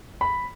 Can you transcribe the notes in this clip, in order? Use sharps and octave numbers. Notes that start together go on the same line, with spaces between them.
B5